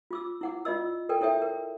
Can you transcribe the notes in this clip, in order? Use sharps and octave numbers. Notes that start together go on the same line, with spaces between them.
F4 D6 E6
E4 F#5 D6
F4 D5 D#5 E6
A4 A#4 D5 G5
E4 A4 C#5 E5 G5
A#4